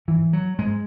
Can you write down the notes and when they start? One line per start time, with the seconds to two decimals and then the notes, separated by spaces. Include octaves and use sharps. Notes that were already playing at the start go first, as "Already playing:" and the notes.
0.08 G#2 E3
0.33 F#3
0.58 G#2 G#3